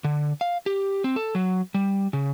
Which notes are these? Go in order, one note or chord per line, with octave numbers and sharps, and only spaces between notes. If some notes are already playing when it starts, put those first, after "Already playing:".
D3
F5
G4
C4
A4
F#3
G3
C#3